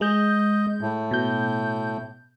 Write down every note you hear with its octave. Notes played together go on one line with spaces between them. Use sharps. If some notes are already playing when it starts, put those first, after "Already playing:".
G#3 D#5 G6
A2
B2 G6